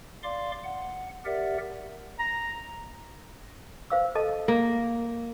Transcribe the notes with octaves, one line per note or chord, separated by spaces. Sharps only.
D5 F5 C6 D6
F#5
G4 A#4 D5 E5 F#5
A#5
C5 F5 E6
A4 D#5 A5
A#3